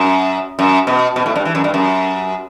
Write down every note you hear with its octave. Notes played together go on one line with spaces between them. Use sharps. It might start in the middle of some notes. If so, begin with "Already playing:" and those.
Already playing: F#2
F#2
B2
B2
A2
G2
E3
F#2
G2
F#2